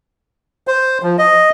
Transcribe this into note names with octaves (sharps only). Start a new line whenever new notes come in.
C5
F3
D#5